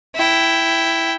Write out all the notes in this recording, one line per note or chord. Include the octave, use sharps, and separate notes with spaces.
E4 G5